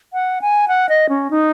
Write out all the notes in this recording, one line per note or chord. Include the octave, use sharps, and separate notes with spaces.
F#5
G#5
F#5
D#5
C#4
D#4